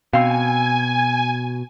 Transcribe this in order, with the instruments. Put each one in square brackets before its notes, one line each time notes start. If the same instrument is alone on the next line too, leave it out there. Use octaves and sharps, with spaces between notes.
[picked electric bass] B2 [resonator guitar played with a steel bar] C4 F5 [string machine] G#5